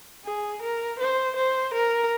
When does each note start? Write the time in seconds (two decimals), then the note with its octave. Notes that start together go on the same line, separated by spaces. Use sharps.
0.25 G#4
0.62 A#4
0.99 C5
1.36 C5
1.74 A#4